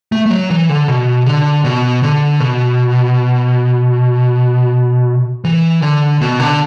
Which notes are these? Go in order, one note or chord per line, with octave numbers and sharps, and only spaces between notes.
A3
A3
F#3
E3
D3
B2
D3
B2
D3
B2
E3
D3
B2
D3